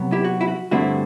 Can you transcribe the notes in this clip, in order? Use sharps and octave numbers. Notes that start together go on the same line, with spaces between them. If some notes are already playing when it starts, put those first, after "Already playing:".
Already playing: C3 F#3 B3
E4 G4
F#4
E4
F#4
G2 D3 A3 C4 E4 F#4